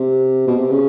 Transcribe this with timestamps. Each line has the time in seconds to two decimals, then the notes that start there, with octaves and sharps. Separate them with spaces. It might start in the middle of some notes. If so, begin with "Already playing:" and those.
Already playing: C3
0.47 B2
0.59 C3
0.70 C#3